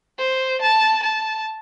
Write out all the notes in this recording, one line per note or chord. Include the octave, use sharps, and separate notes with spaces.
C5
A5
A5